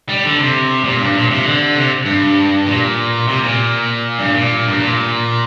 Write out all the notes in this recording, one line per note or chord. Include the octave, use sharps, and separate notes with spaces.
G3
D3
C3
A#2
G2
A#2
C3
D3
C3
G2
A#2
C3
A#2
G2
A#2
G2
A#2